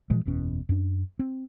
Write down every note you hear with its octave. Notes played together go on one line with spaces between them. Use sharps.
A#2 E3 F3 G#3
F#1 E2 B2 C#4
F#2 D4
C4